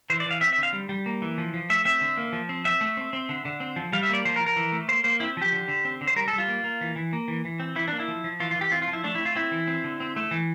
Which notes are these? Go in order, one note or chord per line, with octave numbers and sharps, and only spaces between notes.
E3 C5
D5
E3 F5
C4 E5
E5
D3
F5
G3
G3
A#3
E3
F3
F3
A3 E5
C4 E5
D3
A#3
F3
C4
C4 E5
A3
C4
C4
D3
D3
C4
F3
G3 F5
E5
A#3 D5
F3 C5
A#4
F3
A#4
E3
A3
A#3 C5
A#3 C5
C4 E4
F3 G4
D3
D3
C4
D3
C5
G3 A#4
A4
G3
F4
A#3
A#3
E3
E3
A#3
E3
E3
C4
E3 E4
A#3 D4
E4
F3
F3
E3 F4
F4
E3
G4
C4 F4
F4
F3
E4
A3 D4
E4
C4
F4
C4 E4
E3
C4
D3
C4
A3
E3